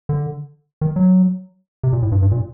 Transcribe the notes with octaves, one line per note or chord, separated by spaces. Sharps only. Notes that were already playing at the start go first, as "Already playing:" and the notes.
D3
D#3
F#3
C3
A#2
A2
G2
G2
A#2